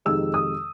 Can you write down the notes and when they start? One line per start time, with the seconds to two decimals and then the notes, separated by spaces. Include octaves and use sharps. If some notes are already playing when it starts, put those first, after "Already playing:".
0.05 F2 C3 D#3 G#3 E6
0.34 D#6